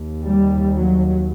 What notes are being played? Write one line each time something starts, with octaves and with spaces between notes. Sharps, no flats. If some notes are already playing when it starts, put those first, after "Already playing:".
Already playing: D#2
G3
F#3